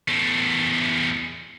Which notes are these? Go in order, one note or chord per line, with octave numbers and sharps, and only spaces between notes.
E2 A3